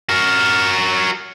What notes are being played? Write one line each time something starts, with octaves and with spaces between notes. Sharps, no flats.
F#4 A#4